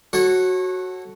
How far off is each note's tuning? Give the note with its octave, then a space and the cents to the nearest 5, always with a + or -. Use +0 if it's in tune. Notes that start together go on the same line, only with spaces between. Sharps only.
F#4 +0 A4 +0 C#5 -30